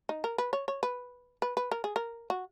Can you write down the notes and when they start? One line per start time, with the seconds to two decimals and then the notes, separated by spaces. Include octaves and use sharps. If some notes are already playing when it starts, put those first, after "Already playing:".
0.09 D#4
0.24 A#4
0.38 B4
0.53 C#5
0.68 C#5
0.83 B4
1.42 B4
1.57 B4
1.71 A#4
1.84 G#4
1.96 A#4
2.30 F#4